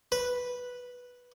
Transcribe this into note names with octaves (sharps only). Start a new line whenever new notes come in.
B4